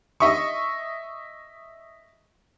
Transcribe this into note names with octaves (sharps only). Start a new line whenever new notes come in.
D#5 E5 C#6